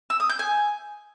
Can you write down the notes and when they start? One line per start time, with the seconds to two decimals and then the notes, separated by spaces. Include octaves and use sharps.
0.10 E6
0.20 D#6
0.29 G6
0.39 G#5